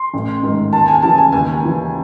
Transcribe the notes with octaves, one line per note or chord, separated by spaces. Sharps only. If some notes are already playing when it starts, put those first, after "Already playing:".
Already playing: C6
A1
G#2 D#3
D#2 A5
G#5
C#3 E3 A5
G#5
D#2 G#5
G#5
C#3 E3